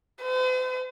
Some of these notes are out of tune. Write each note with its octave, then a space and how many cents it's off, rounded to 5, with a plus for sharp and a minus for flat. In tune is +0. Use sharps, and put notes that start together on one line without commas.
C5 -45